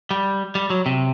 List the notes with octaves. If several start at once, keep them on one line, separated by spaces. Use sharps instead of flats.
G3
G3
F#3
C3